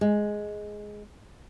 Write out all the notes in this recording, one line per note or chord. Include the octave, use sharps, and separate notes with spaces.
G#3